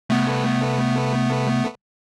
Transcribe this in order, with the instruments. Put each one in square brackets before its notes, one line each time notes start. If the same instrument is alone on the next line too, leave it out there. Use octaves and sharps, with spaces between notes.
[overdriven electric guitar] C2 [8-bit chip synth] A3 B3